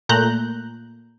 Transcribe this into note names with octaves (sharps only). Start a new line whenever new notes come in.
A#2 A3 A#5 F#6 G6